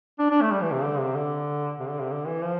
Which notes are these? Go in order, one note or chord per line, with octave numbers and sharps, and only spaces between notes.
D4
D4
A3
G3
E3
C3
D3
C3
D3
C3
D3
C3
D3
E3
F3